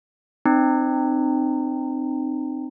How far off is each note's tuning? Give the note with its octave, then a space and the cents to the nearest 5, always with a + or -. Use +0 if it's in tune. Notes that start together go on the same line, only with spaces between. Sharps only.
C4 +0 D#4 -35